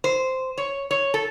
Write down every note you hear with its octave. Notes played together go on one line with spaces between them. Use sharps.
C5
C#5
C#5
A4